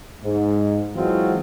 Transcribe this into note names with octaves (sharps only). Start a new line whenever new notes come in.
G#2
E3 F#3 G#3 C4 F4 F#4